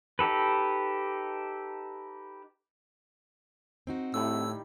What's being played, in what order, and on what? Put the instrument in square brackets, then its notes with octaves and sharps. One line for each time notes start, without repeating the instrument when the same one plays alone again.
[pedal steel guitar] D#4 G4 A4 B4
[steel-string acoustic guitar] C4 D#4 F#4
[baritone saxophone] A2 [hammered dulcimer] D#3 G3 E4 [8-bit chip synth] E6